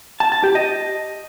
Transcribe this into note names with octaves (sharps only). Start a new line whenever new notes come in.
A5
A5
G4
D#5